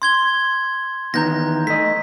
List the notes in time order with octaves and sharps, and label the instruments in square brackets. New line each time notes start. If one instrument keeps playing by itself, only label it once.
[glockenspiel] C6 G#6 G7
[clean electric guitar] E2 D#3 B3 [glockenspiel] A#5 G6 A#6
[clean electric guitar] A3 D#5 [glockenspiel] B6